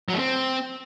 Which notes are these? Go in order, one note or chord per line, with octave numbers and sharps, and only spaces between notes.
F#3
A3
C4